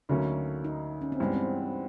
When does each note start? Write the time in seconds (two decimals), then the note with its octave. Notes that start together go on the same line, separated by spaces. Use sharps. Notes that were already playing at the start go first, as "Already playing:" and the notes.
0.09 D2 D3 F#3 A#3 C#4 D#4
0.65 D#4
1.02 C#4
1.12 C4
1.20 G2 E3 G#3 B3
1.33 C4